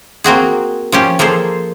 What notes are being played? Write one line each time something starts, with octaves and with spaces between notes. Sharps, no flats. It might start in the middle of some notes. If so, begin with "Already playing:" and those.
A#3 C4 F#4 G#4
F3 C#4 G4
F3 A#3 G#4 A4 C5